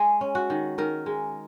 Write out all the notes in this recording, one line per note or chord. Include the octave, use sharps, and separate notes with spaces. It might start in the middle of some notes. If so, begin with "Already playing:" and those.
Already playing: G#3 G#4
C#4
F#4
D#3
D#3 A#4
G#3